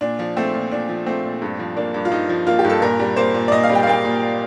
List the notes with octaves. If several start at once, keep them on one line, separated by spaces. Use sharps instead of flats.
A#2 D4
F3
A3 C4
A#2
A#2 D4
F3
A3 C4
A#2
G2
F3
A#3 D4
G2
F4
G2 D#4
F3
A#3 F4
G4
G2 A4
A#2 A#4
G3
A#3 C5
A#2
D5
A#2 D#5
F5
G3
G5
F5
A#3 G5
A#2